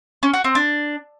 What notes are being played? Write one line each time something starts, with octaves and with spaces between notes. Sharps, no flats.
C#4
F#4
C4
D4